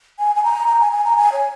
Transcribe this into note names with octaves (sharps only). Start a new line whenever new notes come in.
G#5
G#5
A#5
A#5
G#5
G#5
A#5
G#5
C#5